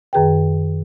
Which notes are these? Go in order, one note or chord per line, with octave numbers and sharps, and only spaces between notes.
F#2 D#3 G#4 B4 G5